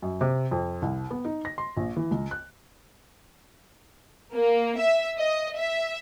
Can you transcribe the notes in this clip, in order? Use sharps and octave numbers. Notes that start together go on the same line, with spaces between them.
F#2
C3
F2
C2
B3
D#4
A#6
C6
A#1
E3
C#2
F#6
A#3
E5
D#5
E5